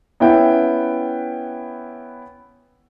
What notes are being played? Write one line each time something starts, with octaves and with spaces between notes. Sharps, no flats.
B3 C#4 E4 E5 F#5 G5